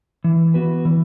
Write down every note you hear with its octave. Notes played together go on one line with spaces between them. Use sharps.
E3
B3 F#4 B4
E3